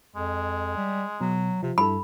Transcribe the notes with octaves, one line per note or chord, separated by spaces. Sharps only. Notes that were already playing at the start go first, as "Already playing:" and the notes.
F2 G#3
G3
B2 F#3
C3 F3
G2 E4 A4 B5